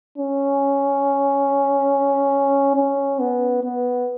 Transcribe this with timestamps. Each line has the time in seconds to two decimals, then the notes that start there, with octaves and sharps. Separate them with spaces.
0.18 C#4
2.76 C#4
3.20 B3
3.63 B3